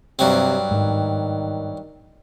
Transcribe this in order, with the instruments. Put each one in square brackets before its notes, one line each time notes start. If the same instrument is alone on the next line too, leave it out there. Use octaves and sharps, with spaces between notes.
[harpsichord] G2 F#3 C4 [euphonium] C3
[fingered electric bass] G#2 [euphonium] D#3